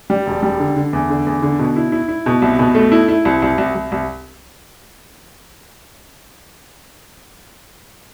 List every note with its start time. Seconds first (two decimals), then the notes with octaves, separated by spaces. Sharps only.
0.10 G3
0.26 E1
0.43 G3
0.59 D3
0.76 D3
0.93 E2
1.09 D3
1.27 E2
1.42 D3
1.59 B2
1.76 E4
1.92 E4
2.09 E4
2.26 B2
2.42 C2
2.59 B2
2.75 A3
2.92 E4
3.08 E4
3.25 C2
3.42 C2
3.58 C2
3.75 C2
3.92 C2